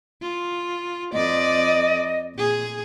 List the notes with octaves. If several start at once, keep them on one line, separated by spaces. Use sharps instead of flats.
F4
F2 D5 D#5
A#2 G#4